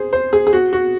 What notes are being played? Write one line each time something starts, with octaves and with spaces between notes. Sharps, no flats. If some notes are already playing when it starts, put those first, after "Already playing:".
Already playing: G#4 C5
C5
G#4
G#4
F#4
F#4